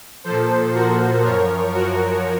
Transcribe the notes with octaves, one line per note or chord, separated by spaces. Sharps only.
A#2 F3 A4 C5
F#4 A#4
F#2 F3 A#4 C#5
F#4 A#4